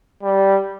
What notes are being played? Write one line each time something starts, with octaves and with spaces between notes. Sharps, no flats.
G3